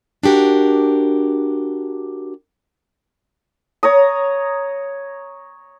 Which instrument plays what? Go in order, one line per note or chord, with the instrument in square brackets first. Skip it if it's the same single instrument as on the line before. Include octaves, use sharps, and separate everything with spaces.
[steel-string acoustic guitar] D4 F#4 G4 A#4
[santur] C#5 A#5 D#6